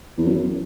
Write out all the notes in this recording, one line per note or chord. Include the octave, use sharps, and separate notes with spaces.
E2
F#2